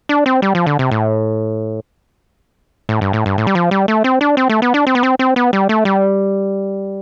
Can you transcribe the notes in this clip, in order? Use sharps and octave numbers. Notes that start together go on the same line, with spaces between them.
D4
C4
G3
F3
D3
C3
A2
A2
G2
A2
G2
A2
G3
F3
G3
A3
C4
D4
C4
A3
B3
D4
C4
B3
C4
C4
B3
G3
A3
G3